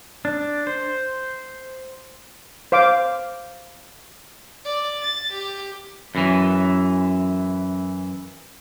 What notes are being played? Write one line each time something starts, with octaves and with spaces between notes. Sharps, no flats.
D4
C5
C5 F5 D6
D5
A6
G4
F#2 E3